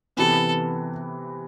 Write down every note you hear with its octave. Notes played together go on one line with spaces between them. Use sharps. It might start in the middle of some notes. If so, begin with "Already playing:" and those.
C3 E3 B3 A4